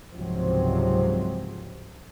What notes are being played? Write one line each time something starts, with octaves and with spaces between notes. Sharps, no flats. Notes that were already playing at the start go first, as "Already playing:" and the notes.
C#2 G#2 C3 F3 F#3 C4